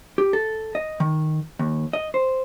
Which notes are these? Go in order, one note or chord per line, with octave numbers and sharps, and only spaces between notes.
G4
A4
D#5
D#3
D#2
D#5
C5